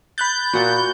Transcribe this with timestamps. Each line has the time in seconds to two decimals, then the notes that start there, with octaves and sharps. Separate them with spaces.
0.18 B5 F#6 G6 A6
0.53 A#2 F#4 F#5